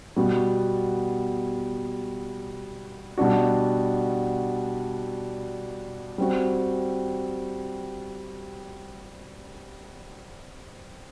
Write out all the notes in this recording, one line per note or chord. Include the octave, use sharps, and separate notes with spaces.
B2 G3 B3 F#4
B2 G3 D4 F#4
G3 C4 F#4